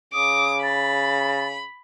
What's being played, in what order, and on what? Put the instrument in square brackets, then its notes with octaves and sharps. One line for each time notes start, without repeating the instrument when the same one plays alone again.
[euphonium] C#3 [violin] D6 [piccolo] D#6
[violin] B5 [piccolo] A6